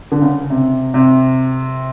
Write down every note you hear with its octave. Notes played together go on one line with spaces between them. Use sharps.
D3
C#3
C3
C3